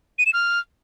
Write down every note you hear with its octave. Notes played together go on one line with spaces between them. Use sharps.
D#7
E7
F6